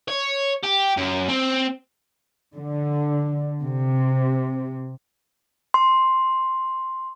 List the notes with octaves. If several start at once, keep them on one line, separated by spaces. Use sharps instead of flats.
C#5
G4
F#2
C4
D3
C3
C6